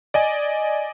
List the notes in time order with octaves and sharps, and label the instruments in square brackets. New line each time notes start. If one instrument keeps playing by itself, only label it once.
[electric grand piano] D5 D#5 G#5